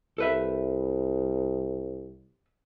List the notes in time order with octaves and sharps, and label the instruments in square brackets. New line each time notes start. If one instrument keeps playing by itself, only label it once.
[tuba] C2 [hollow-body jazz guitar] A4 B4 E5